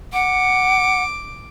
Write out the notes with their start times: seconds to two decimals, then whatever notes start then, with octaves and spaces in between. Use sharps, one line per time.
0.13 F#5 D6